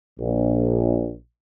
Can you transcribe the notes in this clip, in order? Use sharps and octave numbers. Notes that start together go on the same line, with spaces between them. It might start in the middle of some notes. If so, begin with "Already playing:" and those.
A#1